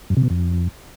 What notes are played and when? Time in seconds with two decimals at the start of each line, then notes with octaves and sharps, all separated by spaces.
0.10 F#2
0.17 C3
0.23 B2
0.30 F2